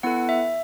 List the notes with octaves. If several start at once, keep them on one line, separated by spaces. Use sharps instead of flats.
B3 E4 A4 F#5
E5